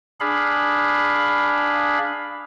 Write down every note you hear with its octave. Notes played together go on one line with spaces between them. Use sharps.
D4 G#4 F5 B5